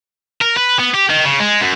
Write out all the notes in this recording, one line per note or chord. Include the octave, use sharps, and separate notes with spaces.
A#4
B4
B3
G4
D#3
C#3
G#3
F#2